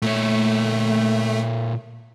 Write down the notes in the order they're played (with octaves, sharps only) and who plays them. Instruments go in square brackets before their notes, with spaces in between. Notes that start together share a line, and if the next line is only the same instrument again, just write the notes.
[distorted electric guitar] A#2 C#5 [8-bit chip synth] A3